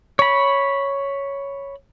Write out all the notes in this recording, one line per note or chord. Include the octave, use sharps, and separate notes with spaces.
C#5 B5